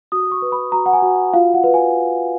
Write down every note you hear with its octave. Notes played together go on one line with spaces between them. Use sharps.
F#4 D#6
C#6
B4
B5
F#4 A#5
F#5
G#5
F#4
F4 F5
F#5
B4
G#5